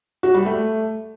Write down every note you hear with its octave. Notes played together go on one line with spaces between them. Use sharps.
F#4
G3
A3